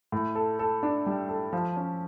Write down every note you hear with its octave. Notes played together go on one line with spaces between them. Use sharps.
A2
A4
A4
D4
G3
A4
F3
C#4